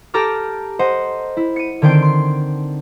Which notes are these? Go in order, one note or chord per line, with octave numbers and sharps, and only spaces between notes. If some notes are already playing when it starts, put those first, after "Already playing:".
G4 A4 A#5 D6 F6
C5 D#5 F#5
E4
C#7 D#7
D3 D#3 C4 G5 C7 D7
C6